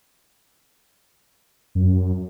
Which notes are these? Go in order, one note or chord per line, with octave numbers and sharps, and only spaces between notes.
F#2